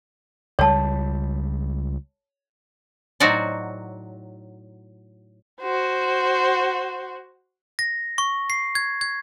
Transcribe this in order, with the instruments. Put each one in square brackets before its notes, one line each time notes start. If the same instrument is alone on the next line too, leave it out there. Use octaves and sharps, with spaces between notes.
[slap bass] C#2 G3 [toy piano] C#5 A5
[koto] A2 F#3 D#4 F#4 C5 D5
[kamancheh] F#4 C5
[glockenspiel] A#6
C#6
C7
G#6
G#6